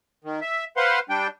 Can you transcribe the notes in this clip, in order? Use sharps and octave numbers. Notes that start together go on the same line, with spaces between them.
D#3
E5
B4 C5 F5 F#5 C6
G3 D4 G5